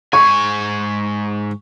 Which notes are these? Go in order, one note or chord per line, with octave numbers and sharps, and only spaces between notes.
G#2 G#5 C#6